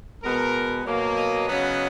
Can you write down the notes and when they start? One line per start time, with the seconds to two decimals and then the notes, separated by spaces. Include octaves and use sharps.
0.23 B2 G#3 B3 A#4
0.85 B2 F#3 A#3
1.16 D#5
1.47 C#3 F#3 B3